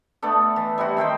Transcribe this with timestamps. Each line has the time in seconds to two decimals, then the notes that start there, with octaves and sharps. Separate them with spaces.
0.22 A3 B3 D4 A4
0.56 E3
0.78 G3 C4 E4 F#4
0.97 D#3 C4 C5 G5